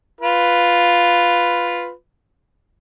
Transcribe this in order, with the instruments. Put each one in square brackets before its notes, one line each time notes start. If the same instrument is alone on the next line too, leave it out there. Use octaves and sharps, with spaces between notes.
[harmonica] F4 B4